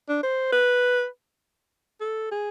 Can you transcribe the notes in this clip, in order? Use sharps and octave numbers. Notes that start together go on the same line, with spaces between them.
D4
C5
B4
A4
G#4